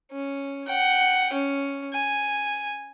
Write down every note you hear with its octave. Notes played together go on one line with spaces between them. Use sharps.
C#4
F#5 G5
C#4
G#5